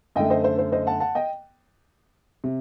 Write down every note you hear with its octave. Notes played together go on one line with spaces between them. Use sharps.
F#2 D3 A3 D#5 G5
C5 D#5
C5
C5
C5 D#5
F#5 A5
F#5 A5
D#5 G5
C3